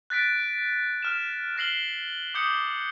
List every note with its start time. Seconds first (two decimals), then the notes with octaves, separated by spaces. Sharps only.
0.10 F#6 A6 B6 D7
1.02 F6 E7
1.57 F6 A#6 C7 F#7 G7
2.34 D6 D#6 G6 C#7 G7